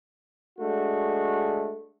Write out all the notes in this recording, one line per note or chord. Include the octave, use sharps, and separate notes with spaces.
G#3 A3 D4 F#4